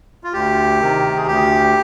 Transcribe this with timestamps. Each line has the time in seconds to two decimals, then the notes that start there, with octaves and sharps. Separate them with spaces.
0.24 F4
0.33 D2 G4
0.80 C3 D#3
1.17 G#4
1.27 D2 G4